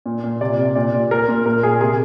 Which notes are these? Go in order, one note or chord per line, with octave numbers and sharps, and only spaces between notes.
A#2
A#2
C3 D5
C3
A#2 D5
A#2
A#2 A#4
A#2
A#2 A#4
A#2 G#4
C3 G#4